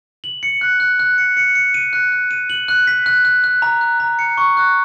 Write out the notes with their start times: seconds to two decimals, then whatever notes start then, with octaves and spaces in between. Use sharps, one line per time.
0.24 F#7
0.43 C#7
0.61 F#6
0.80 F#6
0.99 F#6
1.18 C#7
1.37 C#7
1.55 C#7
1.74 D#7
1.93 F#6
2.12 F#6
2.31 D#7
2.50 F#7
2.68 F#6
2.87 B6
3.06 F#6
3.25 F#6
3.44 F#6
3.62 A#5
3.81 F#6
4.00 A#5
4.19 C#7
4.38 C#6
4.57 F#6